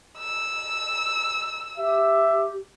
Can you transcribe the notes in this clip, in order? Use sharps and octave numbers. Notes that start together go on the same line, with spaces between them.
E6
G4 E5